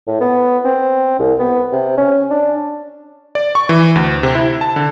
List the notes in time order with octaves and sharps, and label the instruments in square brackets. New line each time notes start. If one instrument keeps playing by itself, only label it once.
[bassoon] A2
B3
C4
C2
B3
C3
C#4
D4
[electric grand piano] D5
C#6
E3
D2
C3
E4
A5
D3